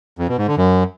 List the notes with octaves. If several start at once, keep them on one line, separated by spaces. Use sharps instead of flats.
F2
B2
G#2
D3
F#2